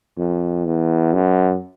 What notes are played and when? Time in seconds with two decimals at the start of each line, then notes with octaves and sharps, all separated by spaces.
0.18 F2
0.65 E2
1.13 F#2